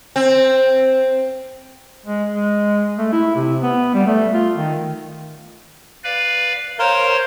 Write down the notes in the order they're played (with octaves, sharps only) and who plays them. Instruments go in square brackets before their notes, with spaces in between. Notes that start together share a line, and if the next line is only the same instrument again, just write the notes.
[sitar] C4
[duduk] G#3
G#3
A3
E4
C3
B3
G3
A3
F4
D#3
[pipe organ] B4 D5 F5
[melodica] A#4 F5 [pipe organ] C5 C#5 C6